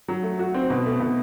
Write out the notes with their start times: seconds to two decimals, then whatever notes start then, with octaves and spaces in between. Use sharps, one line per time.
0.08 F#3
0.23 A3
0.39 F#4
0.54 C4
0.70 B2
0.86 A3
1.00 B2